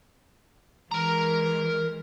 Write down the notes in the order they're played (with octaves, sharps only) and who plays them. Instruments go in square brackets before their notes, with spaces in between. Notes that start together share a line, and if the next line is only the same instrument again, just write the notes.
[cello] E3 G#3 [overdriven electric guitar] A#4 A#5